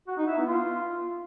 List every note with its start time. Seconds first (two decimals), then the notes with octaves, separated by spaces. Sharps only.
0.08 F#4
0.17 D#4
0.27 E4
0.37 B3
0.47 F4